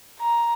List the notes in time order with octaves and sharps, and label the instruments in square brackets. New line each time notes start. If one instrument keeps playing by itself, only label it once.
[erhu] A#5